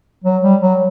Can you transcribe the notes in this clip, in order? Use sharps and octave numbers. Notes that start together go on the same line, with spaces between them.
F#3
G3
F#3